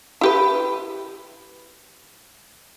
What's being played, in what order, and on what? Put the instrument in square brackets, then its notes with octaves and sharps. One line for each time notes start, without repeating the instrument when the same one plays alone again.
[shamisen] E4 G4 B4